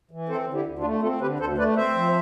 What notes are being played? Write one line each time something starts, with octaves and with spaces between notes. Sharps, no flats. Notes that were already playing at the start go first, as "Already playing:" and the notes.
E3
C4 A4 C5
D3
E4 G4
D2
D4 F4
A3
C4 F4 A4
D3 G4 B4
D2 A4 C5
A3 B4 D5
C4 C5 E5
F3